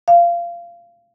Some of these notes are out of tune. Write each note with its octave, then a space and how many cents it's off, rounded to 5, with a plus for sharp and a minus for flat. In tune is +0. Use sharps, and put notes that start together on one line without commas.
F5 -20